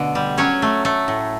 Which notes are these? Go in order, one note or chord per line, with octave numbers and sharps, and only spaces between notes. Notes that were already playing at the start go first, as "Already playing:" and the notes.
Already playing: B2 D3 A3
G3
F#3 C#4 C#5
A3
A3
A2